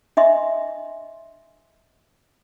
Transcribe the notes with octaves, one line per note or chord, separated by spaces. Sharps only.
D4 D#5 E5 C6